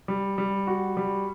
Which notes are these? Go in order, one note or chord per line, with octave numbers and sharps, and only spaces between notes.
G3
G3
F#4
G3